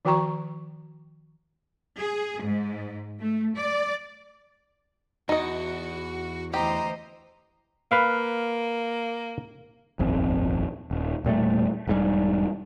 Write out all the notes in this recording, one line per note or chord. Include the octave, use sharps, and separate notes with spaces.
D#3 F3 F#4 G5 A#5 C#6
G#4
G#2
A3
D5
E2 D#4 F#4 D#5
D2 E3 G4 C5 D#5 A#5
A#3 B4 F5
D#1 G#1 F2
D#1
E1 A#2 G3 A3
E1 G#2 G3